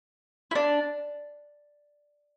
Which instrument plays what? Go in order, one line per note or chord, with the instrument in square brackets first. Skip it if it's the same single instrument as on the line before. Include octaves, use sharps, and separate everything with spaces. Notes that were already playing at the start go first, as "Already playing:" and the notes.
[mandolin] E4
D4